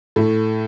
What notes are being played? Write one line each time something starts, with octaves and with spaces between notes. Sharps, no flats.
A2 A3 E4